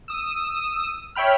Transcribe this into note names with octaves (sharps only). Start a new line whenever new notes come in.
D#6 E6
C#5 E5 G5 B5 F6